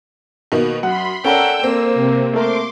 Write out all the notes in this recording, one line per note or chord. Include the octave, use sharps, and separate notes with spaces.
B2 D#3 A#3
F#2 F#5 B5 C6
C#4 A4 A#4 D5 F#5 G5 E6
A#3 C4
C3
A3 A#4 C6 D6